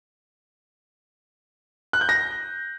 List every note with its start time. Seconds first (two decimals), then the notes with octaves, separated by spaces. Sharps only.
1.93 F#6
2.01 G6
2.09 A#6